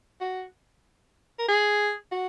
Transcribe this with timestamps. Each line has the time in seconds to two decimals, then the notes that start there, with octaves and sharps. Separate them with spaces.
0.21 F#4
1.39 A#4
1.48 G#4
2.12 F#4